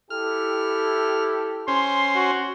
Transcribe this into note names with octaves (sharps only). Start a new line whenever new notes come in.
E4 G4 A4 F6
C#4 C5 C6
F#4